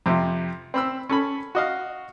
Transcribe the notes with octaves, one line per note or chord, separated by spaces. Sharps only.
F2 C3
C4 B5 E6
C#4 A4 B5
F#4 D#5 F5